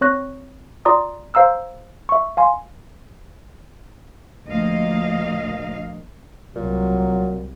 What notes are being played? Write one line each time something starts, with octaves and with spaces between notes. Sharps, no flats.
C4 C#5 C#6 F#6 A#6
F4 D5 A#5 C6 D6 D#6
C5 F5 A#5 E6 F6
E5 C#6
F5 G#5 C6
D2 A#2 F3 A#3 D#5 F5
C2 A#2 F#3